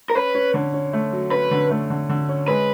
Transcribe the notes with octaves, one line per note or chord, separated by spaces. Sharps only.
A#4
C#4 B4
C#4
D3
C#4
A3
F#3
C#4 B4
D3
A3
D3
D3
C#4
G#3 B4